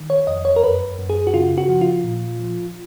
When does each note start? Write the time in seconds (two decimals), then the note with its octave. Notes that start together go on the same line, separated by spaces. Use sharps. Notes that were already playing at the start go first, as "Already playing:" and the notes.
Already playing: D#3
0.10 C#5
0.27 F2 D#5
0.45 C#5
0.56 A#4
0.63 F#2 B4
0.99 F#2
1.10 G#4
1.27 F#4
1.34 C#3 F4
1.58 F#4
1.69 F3
1.81 F4
2.04 A#2
2.39 F3